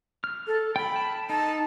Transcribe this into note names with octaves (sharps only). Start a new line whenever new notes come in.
F6
A4
G5 B5
A5
D#4 A5